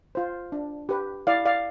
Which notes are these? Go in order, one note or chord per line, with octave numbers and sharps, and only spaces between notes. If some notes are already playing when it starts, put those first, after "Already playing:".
F4 C5
D4
G4 B4
E4 D5 F5
D5 F5